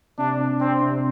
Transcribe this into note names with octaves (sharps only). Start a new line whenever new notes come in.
C3 D4
D4
C4 D4
C3